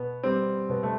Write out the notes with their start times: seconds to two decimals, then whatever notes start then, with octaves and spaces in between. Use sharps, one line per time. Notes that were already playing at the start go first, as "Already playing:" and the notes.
Already playing: B2 B3
0.23 G3 C4
0.69 B2 B3
0.83 A3